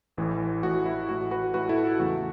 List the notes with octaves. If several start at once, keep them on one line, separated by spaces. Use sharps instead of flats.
A1 A2 E3
A1 A2 E3 F#4
E4
A1 A2 E3 F#4
F#4 B4
A1 A2 E3 F#4 B4
E4 A4
F#4
E2 C#3 E3 A3 F#4